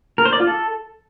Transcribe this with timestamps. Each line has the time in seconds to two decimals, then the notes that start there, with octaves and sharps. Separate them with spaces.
0.18 A#4
0.25 C5
0.33 D5
0.40 F4
0.47 A4